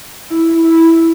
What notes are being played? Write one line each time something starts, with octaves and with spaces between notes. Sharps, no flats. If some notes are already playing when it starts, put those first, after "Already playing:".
E4
E4